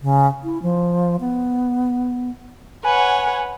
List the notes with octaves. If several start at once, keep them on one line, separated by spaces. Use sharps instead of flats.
C#3
E4
F3
B3
B4 C#5 F#5 G#5